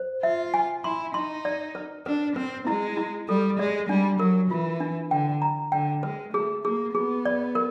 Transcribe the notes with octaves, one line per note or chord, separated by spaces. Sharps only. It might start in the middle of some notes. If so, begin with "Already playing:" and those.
Already playing: C5
F4 E5
G#5
E4 C6
D#4 C6
D5
B4
D4 B4
C4 B4
G#3 E4
E4
G3 A4
G#3 D5
G3 D4
F#3 A#4
E3 F4
D4
D3 G5
A#5
D3 G5
G#3 B4
A3 G#4
A#3 G#4
B3 G#4
D5
A#4